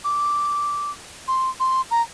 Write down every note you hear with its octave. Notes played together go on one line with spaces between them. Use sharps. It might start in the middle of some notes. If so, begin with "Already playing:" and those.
D6
C6
C6
A#5